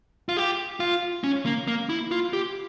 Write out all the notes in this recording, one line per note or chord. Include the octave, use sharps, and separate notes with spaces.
F4
G4
F4
C#4
A#3
A#3
E4
F4
G4